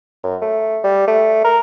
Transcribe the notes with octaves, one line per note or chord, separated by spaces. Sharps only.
F#2
A3
G3
A3
A#4